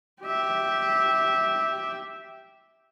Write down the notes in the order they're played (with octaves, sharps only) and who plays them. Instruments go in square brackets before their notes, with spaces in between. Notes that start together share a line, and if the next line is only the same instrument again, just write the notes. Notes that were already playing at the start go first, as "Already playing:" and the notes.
[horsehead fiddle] G4 E5